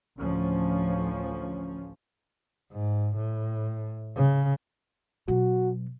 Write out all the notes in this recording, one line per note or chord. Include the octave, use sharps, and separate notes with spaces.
A1 D2 F3 C#4
G#2
A2
C#3
B2 F#3 F#4